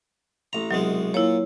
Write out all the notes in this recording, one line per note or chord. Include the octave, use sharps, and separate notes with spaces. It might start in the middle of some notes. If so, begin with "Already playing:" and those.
A1 A#5
C2 B2 F#3 G#3
A#2 E4 C#5